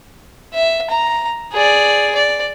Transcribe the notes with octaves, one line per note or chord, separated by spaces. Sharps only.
E5
A#5
G#4 D5
D5